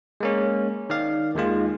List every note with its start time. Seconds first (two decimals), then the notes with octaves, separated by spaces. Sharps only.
0.20 G#3 A#3 C#4
0.90 D#3 D5 F5
1.35 D#2 D#3 G#3 F4